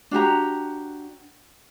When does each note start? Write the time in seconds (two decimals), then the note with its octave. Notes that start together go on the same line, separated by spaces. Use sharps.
0.11 D4 F#4 G4 A#5